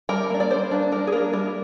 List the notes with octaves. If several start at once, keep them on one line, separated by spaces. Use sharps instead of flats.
G3 A#4
A#3 D4
D5
G3 C5
A#3 D4
G3 A#4
G#4
A#3 D4 A#4
G3 A#4